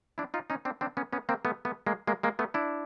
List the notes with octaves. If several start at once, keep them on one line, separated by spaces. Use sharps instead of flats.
D4 E4
D#4 F4
C#4 D#4
C4 D4
C4 D4
B3 C#4
B3 C#4
A#3 C4
A3 B3
A3 B3
G#3 A#3
G#3 A#3
G#3 A#3
A3 B3
D4 E4